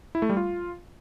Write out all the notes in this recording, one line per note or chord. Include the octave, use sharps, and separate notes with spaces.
E4
A3
G3
F4